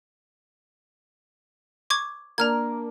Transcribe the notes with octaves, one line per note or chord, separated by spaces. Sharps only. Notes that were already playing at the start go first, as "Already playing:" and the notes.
C#6 D6 G#6
A#3 D4 A#5 F6 G#6